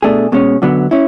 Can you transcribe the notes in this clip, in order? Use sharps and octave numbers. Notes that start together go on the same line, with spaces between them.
B2 A3 D4 G#4
B2 G#3 C#4
F#2 D3 F#3 B3
C#4 E4